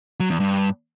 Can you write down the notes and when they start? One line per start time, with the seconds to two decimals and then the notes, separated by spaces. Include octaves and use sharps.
0.20 F#3
0.30 E2
0.40 G2